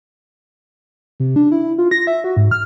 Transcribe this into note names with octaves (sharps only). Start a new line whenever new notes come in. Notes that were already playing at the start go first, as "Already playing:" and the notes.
C3
D4
E4
E4
F4
A#6
E5
F#4
G#2
F6